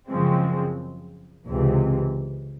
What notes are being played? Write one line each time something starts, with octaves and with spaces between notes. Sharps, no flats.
F#2 C#3 F3 G#3 C4
C#2 C3 E3